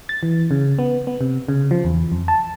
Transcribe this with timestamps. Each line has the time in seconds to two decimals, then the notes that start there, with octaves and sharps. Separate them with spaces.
0.09 A6
0.23 E3
0.51 C#3
0.79 B3
1.07 B3
1.21 C3
1.48 C#3
1.71 F3
1.84 E2
2.12 F2
2.28 A5